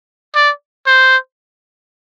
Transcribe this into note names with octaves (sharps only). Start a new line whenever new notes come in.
D5
C5